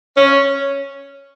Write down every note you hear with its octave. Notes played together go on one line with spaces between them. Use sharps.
C#4